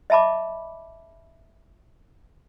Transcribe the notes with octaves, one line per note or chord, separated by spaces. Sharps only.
D#5 E5 A5 B5 D6